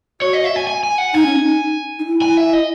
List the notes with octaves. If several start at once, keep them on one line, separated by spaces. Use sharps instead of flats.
F#4 C#5
D#5
E5
G#5
G#5
G#5
F#5
D#4 G#5
C#4
D#4
D#4
E4
G#5
E5
D#5